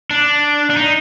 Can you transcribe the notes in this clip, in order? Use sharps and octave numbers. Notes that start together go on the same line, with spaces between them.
D4
D4
D#4